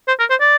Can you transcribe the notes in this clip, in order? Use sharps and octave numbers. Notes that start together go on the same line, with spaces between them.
C5
A#4
C5
D5